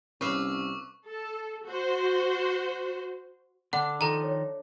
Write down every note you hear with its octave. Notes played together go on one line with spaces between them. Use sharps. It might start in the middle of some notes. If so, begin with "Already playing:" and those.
C2 C#4 B4 F5 C#6 D6 E6
A4
F#4 C5
D3 D4 F#5
D#3 F3 D#4 A4 A#5
C#5